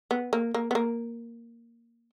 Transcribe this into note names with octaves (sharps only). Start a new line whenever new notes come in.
B3
A#3
A#3
B3
A#3